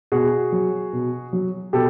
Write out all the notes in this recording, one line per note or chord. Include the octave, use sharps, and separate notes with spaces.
B2 F#4 G#4
F#3
B2
F#3
B2 G4 A4